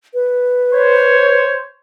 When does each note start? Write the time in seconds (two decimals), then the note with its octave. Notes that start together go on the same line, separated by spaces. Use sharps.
0.14 B4
0.73 C5 C#5